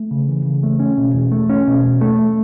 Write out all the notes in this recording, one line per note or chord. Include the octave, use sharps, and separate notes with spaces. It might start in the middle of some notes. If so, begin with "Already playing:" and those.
Already playing: A3
C#3
E3
C#3
A3
C#4
B2
E2
A3
C#4
B2
E2
A3